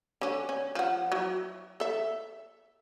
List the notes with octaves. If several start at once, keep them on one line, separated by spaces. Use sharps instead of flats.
D3 C#4
C#4
F3 F#5
F#3 E4
A4 E5